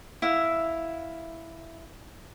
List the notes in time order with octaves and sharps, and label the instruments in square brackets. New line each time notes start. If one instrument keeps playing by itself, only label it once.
[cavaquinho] E4 E5 F5